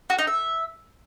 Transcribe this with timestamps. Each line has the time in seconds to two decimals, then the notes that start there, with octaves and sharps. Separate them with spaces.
0.10 F#4
0.18 D#4
0.27 E5